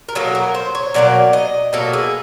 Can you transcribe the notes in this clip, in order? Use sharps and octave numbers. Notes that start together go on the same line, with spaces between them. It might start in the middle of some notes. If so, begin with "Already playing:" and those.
A#4
B2 F#3 A#3 A4
A#4
C5
C#5
B2 F#3 A#3 D5
D#5
B2 F#3 A#3 A4
G#4